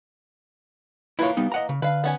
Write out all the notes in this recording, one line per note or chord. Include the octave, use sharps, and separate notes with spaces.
E3 A#3 E4 F4 C#5
G3 B3 D#4
D#5 F#5 A#5
C#3
D3 B4 F5
B3 C#4 G#5